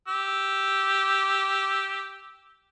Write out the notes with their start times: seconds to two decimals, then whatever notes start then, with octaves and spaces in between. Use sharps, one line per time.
0.08 G4 E6